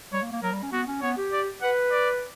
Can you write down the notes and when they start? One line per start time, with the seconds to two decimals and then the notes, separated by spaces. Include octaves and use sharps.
0.13 G3 C#5
0.22 A#3
0.32 A#3
0.42 F#3 A#4
0.52 G3
0.63 C#4
0.72 B3 F#4
0.88 C#4
1.02 B3 C#5
1.17 G4
1.32 D5
1.62 B4 F#5
1.91 D5